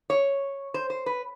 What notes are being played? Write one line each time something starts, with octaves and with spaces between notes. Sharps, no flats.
C#5
C5
C5
B4